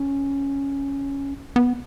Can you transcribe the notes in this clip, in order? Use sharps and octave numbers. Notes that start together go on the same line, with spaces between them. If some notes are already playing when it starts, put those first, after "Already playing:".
Already playing: C#4
B3